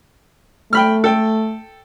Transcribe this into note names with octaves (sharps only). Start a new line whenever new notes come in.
A3 G5 B5 F6
A4 G5